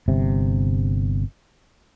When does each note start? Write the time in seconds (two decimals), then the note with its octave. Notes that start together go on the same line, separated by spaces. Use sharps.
0.08 G1 C3